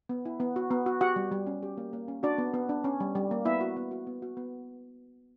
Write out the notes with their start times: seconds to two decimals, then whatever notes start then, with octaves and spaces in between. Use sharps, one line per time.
0.09 B3
0.26 E4
0.40 B3
0.56 F#4
0.71 B3
0.86 F#4
1.01 F#4 G4 F#5
1.16 G3
1.32 G3
1.47 C#4
1.63 G4
1.78 A#3
1.93 A#3
2.08 C#4
2.23 D4 F#4 D5
2.38 B3
2.54 B3
2.69 D4
2.84 C#4
3.00 G3
3.15 G3
3.31 A#3
3.45 B3 E4 E5
3.61 F#4
3.76 B3
3.91 F#4
4.07 B3
4.22 F#4
4.37 B3